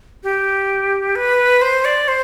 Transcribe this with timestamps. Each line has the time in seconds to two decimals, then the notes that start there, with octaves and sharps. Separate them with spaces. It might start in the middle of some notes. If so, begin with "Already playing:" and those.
0.23 G4
1.15 B4
1.62 C5
1.85 D5
2.08 C5